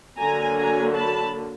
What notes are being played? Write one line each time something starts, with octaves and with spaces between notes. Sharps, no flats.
D3 F#3 A#3 G#5 A#5
G#5 A#5
A5 B5